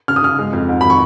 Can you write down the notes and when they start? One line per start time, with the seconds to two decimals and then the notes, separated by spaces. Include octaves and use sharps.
0.08 C#3 F6
0.16 D#6
0.22 C#3 F6
0.39 G#3
0.53 F2
0.68 G#2
0.81 D#3 B5
0.90 C#6